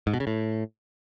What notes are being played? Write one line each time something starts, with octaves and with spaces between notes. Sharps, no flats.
G#2
B2
C#3
A2